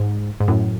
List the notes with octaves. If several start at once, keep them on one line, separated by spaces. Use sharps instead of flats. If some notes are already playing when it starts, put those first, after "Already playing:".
Already playing: G#2
G#2
F#2 A2